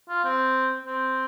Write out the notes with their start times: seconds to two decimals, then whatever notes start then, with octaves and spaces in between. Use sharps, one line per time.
0.09 F4
0.25 C4
0.85 C4